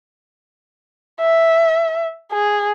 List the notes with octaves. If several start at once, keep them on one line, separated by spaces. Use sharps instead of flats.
E5
G#4